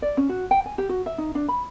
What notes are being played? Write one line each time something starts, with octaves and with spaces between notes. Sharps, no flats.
D5
C#4
F#4
G5
G#5
G4
F#4
E5
D#4
D4
B5